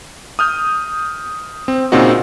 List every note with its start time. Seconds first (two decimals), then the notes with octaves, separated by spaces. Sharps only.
0.39 D#6 F6 G6
1.68 C4
1.92 A#2 C#3 C4 D#4 F#4